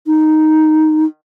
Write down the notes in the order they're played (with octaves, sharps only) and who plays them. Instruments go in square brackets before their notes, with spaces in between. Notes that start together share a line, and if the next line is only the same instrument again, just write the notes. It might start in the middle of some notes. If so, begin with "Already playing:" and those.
[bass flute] D#4